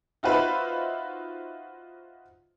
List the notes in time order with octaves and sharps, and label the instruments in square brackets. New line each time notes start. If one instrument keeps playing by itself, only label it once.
[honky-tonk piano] D#4 F4 F#4 B4 C5 E5